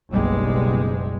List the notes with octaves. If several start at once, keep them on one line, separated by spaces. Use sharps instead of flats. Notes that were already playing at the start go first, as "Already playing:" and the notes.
F#1 B1 B2 G3 G#3